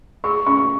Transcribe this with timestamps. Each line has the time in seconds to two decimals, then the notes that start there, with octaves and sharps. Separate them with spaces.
0.24 G#4 C#6
0.46 C#4 C#6